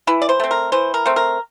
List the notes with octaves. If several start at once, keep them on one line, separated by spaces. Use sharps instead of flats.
E3 E4
D5
C5
A3 C4
A#4
E3 C5
A#4
A3 C4
A#4